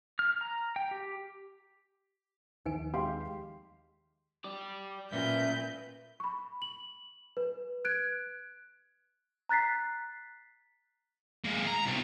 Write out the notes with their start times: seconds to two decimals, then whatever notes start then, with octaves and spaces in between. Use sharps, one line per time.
0.19 F6
0.41 A#5
0.76 G5
0.91 G4
2.66 D#2 D#3 F3 D#4 B4 G#5
2.94 G#3 G4 F5 C6
4.44 G4 D5 D6
5.12 B1 A#2 C#4 B4 E5 G6
6.20 B5 C#6
6.62 F#7
7.37 B4
7.85 F#6 G#6 D7
9.49 A#5 F#6 A6 B6 C7
11.45 G#3 A#3
11.68 A#5
11.86 C2 B2